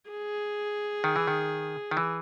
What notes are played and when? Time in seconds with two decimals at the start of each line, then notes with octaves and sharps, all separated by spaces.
0.10 G#4
1.04 D#3
1.16 E3
1.27 D#3
1.91 D#3
1.97 E3